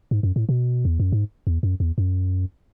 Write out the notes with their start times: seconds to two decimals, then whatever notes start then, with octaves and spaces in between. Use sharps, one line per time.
0.11 G#2
0.23 F#2
0.36 A2
0.49 B2
0.85 E2
1.00 F#2
1.12 G#2
1.47 E2
1.63 F#2
1.80 E2
1.98 F#2